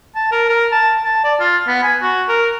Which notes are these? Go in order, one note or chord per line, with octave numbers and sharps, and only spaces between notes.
A5
A#4
A#4
A5
A5
D5
F4
B3
G#5
F#4
A#4